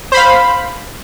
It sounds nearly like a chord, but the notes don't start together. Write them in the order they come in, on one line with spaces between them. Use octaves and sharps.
C5 B5 F5